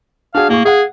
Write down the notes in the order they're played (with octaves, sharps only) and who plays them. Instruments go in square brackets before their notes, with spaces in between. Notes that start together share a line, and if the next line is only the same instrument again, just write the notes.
[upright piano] D4 F#4 G#4 [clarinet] F5
[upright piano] A2 G#4 C#6 [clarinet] A#3
[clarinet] G#4 [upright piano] F5 F#5